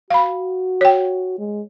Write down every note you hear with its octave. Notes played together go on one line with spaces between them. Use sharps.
F#4 F5 B5
C#5 G5
G#3